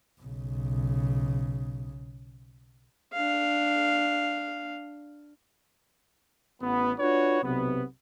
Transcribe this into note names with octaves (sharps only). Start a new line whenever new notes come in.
B1 C#3
D4 F5
A1 B3
D4 F4 F#4 B4 C#5
B1 C3 B3